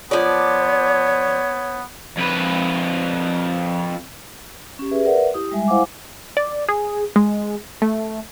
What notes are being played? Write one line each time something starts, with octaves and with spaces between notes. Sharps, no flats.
F3 B3 C#5 D5
F2 B4
C#4 G4
G#4 B4 E5
A#4 B4 D5 E5 F#5
E4 G4 D#6
G3 G#3 E5 G#5
E4 C5 F5 F#5 G#5 D6
D5
G#4
G#3
A3